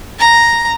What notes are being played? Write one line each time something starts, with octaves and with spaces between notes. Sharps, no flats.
A#5